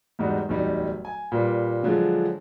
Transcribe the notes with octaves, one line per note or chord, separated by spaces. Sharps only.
E2 G#2 G3 D#4 F#4
D1 E2 G3 D#4
G#5
A#2 G3 B4
D3 F3 F#3 G#3 D4